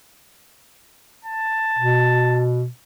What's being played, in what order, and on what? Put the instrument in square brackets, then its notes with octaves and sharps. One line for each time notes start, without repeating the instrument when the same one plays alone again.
[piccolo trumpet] A5
[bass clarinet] B2